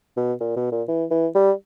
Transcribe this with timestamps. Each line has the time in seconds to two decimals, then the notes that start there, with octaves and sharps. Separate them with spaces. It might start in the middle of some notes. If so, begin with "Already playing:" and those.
0.17 B2
0.41 A#2
0.56 B2
0.72 A#2
0.88 E3
1.11 E3
1.35 G3